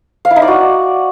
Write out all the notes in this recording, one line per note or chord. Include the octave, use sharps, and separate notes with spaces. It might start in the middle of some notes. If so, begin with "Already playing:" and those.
F5
E4
D#4
D5
F#4